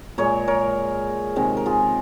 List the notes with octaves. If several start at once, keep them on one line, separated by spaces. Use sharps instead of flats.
A#2 G#3 A#4 C#5
A#4 C#5
C3 D#3 G#3
A#4
F4 G#4